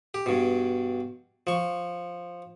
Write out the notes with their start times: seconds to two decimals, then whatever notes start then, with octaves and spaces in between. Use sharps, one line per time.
0.14 G4
0.26 G2 B2
1.47 F3 C#6